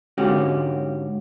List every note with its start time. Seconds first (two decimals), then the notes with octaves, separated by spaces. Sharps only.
0.18 G#2 D3 C#4 F#4 G4